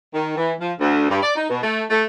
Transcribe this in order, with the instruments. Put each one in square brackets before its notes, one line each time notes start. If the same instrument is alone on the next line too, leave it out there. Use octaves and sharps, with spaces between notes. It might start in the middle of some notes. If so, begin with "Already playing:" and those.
[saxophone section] D#3
E3
F3
D2
G2
D5
D#4
B2
A3
A3